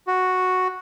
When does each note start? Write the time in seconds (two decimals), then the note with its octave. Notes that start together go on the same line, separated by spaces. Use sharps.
0.07 F#4